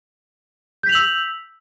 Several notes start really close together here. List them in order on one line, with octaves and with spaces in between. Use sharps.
G6 B6 F7 F#7 E6